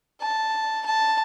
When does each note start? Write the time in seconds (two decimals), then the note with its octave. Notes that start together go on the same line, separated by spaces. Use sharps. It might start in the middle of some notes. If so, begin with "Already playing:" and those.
0.21 A5
0.85 A5